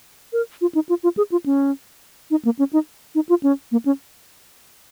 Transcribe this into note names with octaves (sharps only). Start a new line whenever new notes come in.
A#4
F4
D#4
F4
F4
G#4
F4
C#4
D#4
A#3
C#4
D#4
D#4
F4
C#4
A#3
C#4